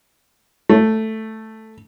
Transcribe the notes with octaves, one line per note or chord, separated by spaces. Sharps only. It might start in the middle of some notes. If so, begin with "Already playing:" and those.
A3